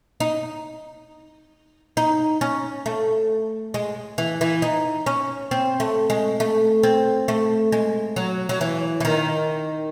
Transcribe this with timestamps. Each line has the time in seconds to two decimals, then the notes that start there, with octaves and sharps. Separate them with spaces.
0.20 D#4
1.97 D#4
2.41 C#4
2.86 A3
3.74 G#3
4.18 E3
4.41 E3
4.62 D#4
5.06 C#4
5.51 C4
5.80 A3
6.10 G#3
6.40 A3
6.83 C4
7.28 A3
7.72 G#3
8.16 F#3
8.49 F#3
8.61 E3
9.00 E3
9.05 D#3